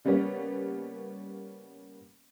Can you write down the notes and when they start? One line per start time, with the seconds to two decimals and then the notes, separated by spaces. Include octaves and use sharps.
0.05 C#3 G3 A#3 B3 C#4